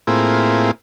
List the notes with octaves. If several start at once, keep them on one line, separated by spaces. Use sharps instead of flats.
A2 A#3 C4 E4 F4 G#4